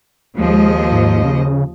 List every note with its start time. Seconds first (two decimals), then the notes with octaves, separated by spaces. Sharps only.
0.37 D#2 F3 G#3 D#5
0.92 G#2
1.24 C#3